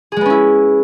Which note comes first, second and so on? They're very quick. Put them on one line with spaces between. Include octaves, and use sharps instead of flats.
G#4 G#3 B3 C#4 E4